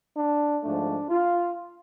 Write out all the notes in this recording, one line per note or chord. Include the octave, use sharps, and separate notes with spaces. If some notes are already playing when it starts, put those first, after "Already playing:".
D4
G#2 F3 A3 D4
F4